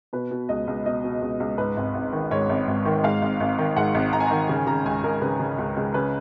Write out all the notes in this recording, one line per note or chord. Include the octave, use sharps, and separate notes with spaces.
B2 B4
B2
C#2 D#5
C#2
B2 D#5
B2
C#2
C#2
G#2 B4
G#1
G#1
D#3
G#2 C#5
G#1
G#1
D#3
G#2 F5
G#1
G#1
D#3
G#2 F#5
G#1
G#1 A#5
G#5
D#3 A#5
C#3
G#5
C#3 A#5
C#2 G#5
C#2 A#4
C#3 B4
C#3
C#2
C#2
C#3 B4